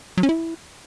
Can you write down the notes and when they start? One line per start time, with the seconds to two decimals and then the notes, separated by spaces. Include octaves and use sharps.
0.17 F#3
0.23 C#4
0.29 E4